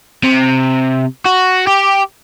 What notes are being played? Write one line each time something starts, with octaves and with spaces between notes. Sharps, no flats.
C3
F#4
G4